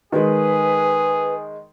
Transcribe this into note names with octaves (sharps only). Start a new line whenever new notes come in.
D#3 G#3 G#4 B4